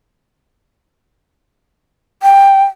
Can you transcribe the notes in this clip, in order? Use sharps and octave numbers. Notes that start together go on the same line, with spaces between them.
G5